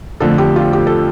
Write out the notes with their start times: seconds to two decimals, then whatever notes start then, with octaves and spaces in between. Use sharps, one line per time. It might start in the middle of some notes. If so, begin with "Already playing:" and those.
0.20 F2 D3 F3 A3 A4
0.38 G4
0.56 F4
0.73 G4
0.87 A4